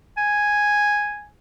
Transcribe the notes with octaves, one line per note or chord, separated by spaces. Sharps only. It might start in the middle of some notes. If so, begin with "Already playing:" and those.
G#5